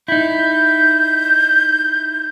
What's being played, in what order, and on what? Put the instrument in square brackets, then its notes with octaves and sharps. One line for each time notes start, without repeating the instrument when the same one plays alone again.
[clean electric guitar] D#4 E4 [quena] G6